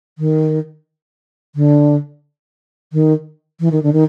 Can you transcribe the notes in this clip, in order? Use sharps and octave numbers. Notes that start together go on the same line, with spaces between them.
D#3
D3
D#3
E3
D#3
D3
D#3